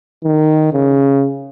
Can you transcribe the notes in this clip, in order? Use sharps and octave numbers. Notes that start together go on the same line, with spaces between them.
D#3
C#3